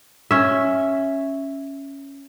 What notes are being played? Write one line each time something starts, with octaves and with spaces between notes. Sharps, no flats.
C#4 E5